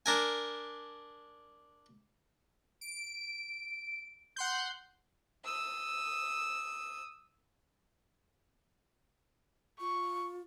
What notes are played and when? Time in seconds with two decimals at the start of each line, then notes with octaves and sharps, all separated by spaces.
0.06 D4 A#4 G#5
2.81 D7
4.36 F#5 C6 G6
5.44 D#6 E6
9.80 F4 C#6